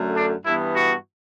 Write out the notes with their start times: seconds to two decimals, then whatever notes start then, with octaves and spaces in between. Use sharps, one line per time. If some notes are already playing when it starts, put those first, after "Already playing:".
Already playing: F#2 D3 A3
0.16 D4
0.45 G2 E3 B3 E4
0.76 F#4